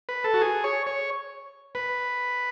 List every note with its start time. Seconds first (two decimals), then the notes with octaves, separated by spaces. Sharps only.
0.09 B4
0.24 A4
0.34 F#4
0.41 G#4
0.64 C#5
0.87 C#5
1.75 B4